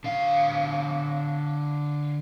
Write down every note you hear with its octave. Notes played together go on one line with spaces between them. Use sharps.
D3 F5